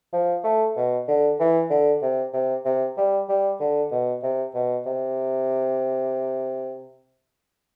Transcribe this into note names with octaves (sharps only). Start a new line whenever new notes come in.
F3
A3
B2
D3
E3
D3
C3
C3
C3
G3
G3
D3
B2
C3
B2
C3